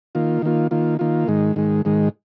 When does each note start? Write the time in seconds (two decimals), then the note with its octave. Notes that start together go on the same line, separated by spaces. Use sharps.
0.15 D#3 A#3 F4
0.42 D#3 A#3 F4
0.71 D#3 A#3 F4
0.99 D#3 A#3 F4
1.28 G#2 D#3 G#3
1.56 G#2 D#3 G#3
1.85 G#2 D#3 G#3